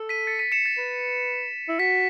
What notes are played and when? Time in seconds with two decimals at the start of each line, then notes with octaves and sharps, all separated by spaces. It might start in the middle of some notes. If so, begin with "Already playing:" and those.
Already playing: A4
0.09 B6 D#7
0.27 A6 C#7
0.39 B6 D#7
0.52 C#7 E7
0.65 A6
0.78 B4
1.68 E4
1.79 F#4 B6